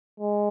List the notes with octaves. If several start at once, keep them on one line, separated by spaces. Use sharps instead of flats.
G#3